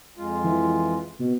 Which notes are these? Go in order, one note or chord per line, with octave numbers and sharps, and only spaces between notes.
F2 G#3 F4
E3
B2